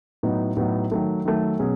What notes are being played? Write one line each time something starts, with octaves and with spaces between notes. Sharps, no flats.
A2 F#3 B3 D#4 F#4
A2 F#3 B3 D#4 F#4
D#3 F#3 A3
D#3 F#3 A3
B2 F#3 C#4 G#4